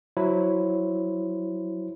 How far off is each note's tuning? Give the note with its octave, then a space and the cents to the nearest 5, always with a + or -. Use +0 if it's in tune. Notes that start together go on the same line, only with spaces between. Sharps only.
F#3 +0 E4 +0 C5 +0